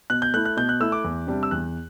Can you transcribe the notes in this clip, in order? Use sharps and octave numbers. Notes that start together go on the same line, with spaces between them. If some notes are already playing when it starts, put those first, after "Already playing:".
B2 F#6
G6
A3 E4 F#6
F#6
B2 G6
F#6
A3 E4 E6
D6
E2
C3 G3 D4
E6
E2 F#6